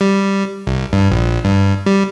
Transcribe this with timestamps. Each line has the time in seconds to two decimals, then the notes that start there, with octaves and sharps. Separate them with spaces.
0.01 G3
0.67 C2
0.93 G2
1.11 A#1
1.44 G2
1.86 G3